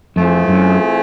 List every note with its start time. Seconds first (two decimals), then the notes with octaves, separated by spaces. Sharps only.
0.16 F2 E3 A3 C4 F4 G#4
0.48 F#2